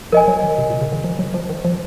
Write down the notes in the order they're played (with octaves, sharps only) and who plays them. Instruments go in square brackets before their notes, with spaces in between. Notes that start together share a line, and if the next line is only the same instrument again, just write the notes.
[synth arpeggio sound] F3 [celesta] A#4 D#5 G#5
[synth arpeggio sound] F#3
D#3
C3
A#2
C#3
D#3
F3
F#3
F3
D#3
F3